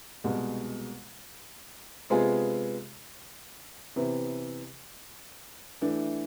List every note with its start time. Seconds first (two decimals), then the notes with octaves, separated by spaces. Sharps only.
0.24 C2 B2 G#3
2.10 C3 G#3 B3 F4 G#4
3.96 C3 E3 B3
5.82 E3 A3 D4